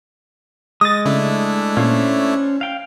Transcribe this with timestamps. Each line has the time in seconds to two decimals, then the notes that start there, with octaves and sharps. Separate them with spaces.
0.81 G#3 D#6 A6 A#6
1.05 C#3 A3 D4 E4
1.77 A#2 A#3 C#4 C5 C#5
2.61 F5 G5